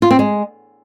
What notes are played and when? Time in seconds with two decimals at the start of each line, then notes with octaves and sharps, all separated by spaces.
0.02 F4
0.11 C4
0.19 G#3